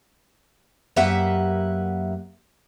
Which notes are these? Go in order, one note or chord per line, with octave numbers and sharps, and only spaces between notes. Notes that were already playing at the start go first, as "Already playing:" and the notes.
F#2 A#3 G4 B4 E5 F#5